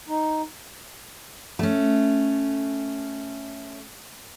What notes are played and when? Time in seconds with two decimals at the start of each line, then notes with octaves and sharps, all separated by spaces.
0.09 D#4
1.59 A3 C#4